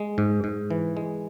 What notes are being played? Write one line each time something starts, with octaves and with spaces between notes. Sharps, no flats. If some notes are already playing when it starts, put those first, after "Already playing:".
Already playing: G#3
G#2
G#2
E3
G#3